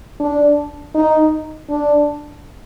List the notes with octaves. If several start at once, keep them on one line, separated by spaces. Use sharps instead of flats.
D4
D#4
D4